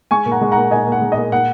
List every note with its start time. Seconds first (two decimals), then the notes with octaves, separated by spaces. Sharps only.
0.11 G#3 G#5 C#6
0.26 A#2
0.32 F#5 A#5
0.41 G#3
0.52 A#2 F#5 A#5
0.71 A#2 D#5 G#5
0.87 A#2
0.92 F#5
1.02 G#3
1.12 A#2 D#5
1.32 A#2 F#5